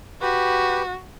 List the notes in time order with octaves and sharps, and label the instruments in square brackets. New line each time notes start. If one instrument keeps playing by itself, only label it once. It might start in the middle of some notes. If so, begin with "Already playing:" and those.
[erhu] F#4 [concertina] G4 B4